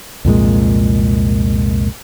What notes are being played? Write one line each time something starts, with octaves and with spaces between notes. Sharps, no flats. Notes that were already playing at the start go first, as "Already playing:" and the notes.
C2 F2 A#2 G#3